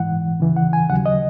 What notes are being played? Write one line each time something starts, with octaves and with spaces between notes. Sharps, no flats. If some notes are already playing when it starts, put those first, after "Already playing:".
Already playing: G#2 E3 F#5
D#2 C#3 E3
F#5
G#5
D#2 C#3 F#3 F#5
D#5